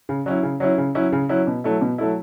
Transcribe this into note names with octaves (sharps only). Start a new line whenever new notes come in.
C#3
F#3 C#4 E4
C#3
F#3 C#4 E4
C#3
F#3 C#4 E4
C#3
F#3 C#4 E4
B2
F#3 A3 E4
B2
F#3 A3 E4